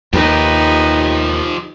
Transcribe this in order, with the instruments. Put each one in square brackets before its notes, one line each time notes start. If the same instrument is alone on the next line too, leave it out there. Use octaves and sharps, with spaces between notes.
[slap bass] D#2 [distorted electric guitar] F3 G4 [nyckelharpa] D#4 B4